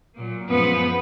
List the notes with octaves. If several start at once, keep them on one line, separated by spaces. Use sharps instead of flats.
A#2 F#3 A#3
F#2 F3 G#3 B3 B4